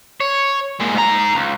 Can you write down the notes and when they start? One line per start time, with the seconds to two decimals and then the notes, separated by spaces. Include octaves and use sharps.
0.20 C#5
0.80 A#2 G#3
0.95 G#2 A#5
1.35 C#2